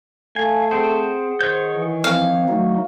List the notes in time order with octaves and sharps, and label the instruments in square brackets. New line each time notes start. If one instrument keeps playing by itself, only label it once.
[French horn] A3 [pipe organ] F5 [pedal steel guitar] G#5
[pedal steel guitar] C4 C5 [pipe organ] G#4 F#5
[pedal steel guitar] D#3 C#5 G6 [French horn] C5
[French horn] E3
[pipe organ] F3 C4 [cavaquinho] F5
[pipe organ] F#3 A3 D#4 [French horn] F#4